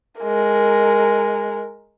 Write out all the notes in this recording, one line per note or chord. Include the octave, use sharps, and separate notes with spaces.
G#3 A#4